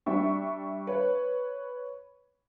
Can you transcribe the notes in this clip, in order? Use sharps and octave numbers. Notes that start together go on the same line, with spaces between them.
G3 D4 E5 G5 C#6
B4 C#5